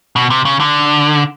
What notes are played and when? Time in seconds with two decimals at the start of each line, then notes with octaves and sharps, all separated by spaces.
0.16 B2
0.30 C3
0.45 C#3
0.60 D3